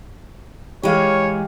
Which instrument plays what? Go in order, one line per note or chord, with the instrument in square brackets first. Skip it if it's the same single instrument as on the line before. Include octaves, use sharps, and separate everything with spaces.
[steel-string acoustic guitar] E3 G#3 [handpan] G4 F5 [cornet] C#5